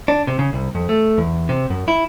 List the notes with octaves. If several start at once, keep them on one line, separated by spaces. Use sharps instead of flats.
D4
C3
C#3
C2
F2
A3
E2
C3
F#2
E4